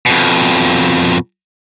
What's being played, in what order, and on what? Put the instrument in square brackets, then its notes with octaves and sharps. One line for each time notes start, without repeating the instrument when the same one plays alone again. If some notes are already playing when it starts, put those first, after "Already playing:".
[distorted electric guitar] F2 B2